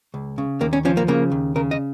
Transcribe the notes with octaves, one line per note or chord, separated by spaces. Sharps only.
C#2
C#3
D#2 A#3
C#4
F3 C#4
A#3
C#3 A#3
D#2
C#3 A#4
D#5